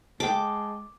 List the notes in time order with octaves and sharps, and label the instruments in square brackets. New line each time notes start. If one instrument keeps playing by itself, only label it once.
[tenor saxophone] G#3 [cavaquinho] G5 A5 [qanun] D6